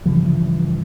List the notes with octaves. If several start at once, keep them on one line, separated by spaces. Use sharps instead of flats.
G2 C#3 E3 F3